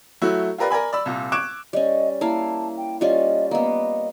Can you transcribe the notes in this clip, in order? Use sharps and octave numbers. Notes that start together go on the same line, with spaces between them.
F#3 A3 E4 F#4
F4 G4 A#4 B4 D5 F5
A#4 D5 G#5 B5
D5 B5 E6
C2 A#2
C#6 D6 F#6 G#6 D7 E7
G3 C#4 D#5
A#3 E4 F5 A5
G5
G3 C#4 F4 D#5
A#3 B3 D#5